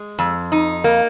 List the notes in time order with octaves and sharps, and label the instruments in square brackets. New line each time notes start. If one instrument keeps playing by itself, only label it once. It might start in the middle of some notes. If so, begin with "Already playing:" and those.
Already playing: [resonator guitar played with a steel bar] G#3
F2
D#4
A#3